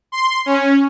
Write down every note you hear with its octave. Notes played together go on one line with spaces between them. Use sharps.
C6
C#4